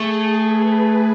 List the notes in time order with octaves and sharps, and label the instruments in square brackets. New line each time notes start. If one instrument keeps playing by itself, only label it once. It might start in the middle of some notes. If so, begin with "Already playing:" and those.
Already playing: [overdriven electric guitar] A3 [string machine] G#4
[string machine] B4